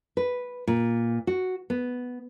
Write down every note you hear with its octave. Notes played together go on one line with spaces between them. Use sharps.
B4
A#2
F#4
B3